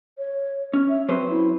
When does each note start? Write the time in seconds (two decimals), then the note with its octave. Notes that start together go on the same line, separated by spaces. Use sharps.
0.18 C#5
0.73 C#4
0.89 E5
1.09 F#3 C4 B4 C5
1.30 E4